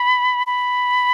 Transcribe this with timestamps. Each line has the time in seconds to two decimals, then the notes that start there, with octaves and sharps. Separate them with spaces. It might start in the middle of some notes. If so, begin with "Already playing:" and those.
Already playing: B5
0.47 B5